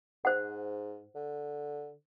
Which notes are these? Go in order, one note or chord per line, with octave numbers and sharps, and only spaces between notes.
G#2 C5 F#5
D3